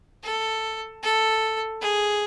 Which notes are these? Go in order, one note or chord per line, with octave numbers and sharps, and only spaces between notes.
A4
A4
G#4